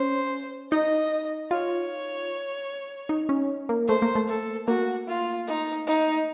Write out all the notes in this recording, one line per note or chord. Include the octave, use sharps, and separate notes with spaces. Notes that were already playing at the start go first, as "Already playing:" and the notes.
Already playing: C#4 C5
D#4 D#5
F4 C#5
D#4
C#4
A#3
A3 C5
A#3
A3
A4
A#3 F#4
F4
D#4
D#4